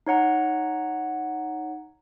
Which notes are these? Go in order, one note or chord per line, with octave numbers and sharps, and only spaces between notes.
D#4 C#5 F#5 A#5